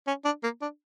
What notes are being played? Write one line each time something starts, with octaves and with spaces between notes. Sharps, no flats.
C#4
D4
A#3
D4